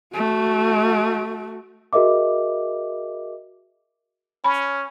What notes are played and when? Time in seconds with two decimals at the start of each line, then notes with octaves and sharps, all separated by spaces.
0.14 A3 F#4
1.93 F#4 G#4 A#4 D#5 E5 D6
4.44 C#4 B5